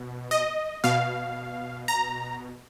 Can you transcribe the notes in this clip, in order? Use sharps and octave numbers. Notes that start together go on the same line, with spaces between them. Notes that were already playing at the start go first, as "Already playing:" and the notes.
Already playing: B2
D#5
B2 F5
A#5